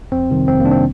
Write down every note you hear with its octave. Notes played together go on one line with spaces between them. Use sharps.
F2 C4
C3 D#3 G3
F2 C4
A#3
C3 D#3 G3 D4
C4